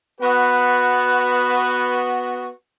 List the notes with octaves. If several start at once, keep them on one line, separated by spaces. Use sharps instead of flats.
B3 F#4 B4